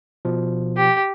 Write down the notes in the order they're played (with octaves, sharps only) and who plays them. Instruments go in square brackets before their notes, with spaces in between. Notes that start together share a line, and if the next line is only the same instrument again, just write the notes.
[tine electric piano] B2 F3
[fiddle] G4